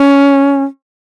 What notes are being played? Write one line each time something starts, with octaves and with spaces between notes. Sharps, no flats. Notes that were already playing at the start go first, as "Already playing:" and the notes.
Already playing: C#4